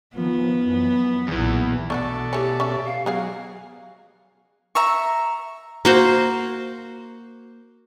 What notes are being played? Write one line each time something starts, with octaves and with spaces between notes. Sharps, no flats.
D#3 F3 B3
F#2 E3
B1 E2 A#2 E3
B2 A3 D4 F#4 A4 D5
E3 A3 C#4 G4
C#4 E5
F5
F#3 G#3 B3 G#4 F5
E5 A#5 C#6
A#3 F#4 C5